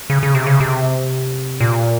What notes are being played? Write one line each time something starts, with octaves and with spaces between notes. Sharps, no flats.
C#3
C#3
C3
C#3
C3
A#2